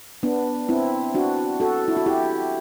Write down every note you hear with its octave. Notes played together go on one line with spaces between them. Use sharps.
B3 D4
C4 E4
D4 F#4
F#4 A4
E4
F#4
E4 G4